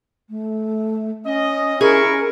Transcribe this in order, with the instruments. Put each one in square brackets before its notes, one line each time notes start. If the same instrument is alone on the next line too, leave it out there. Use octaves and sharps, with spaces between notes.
[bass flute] A3
[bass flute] C#4 [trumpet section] D#5
[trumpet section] E4 C#6 [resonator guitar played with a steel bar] G#4 [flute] A#4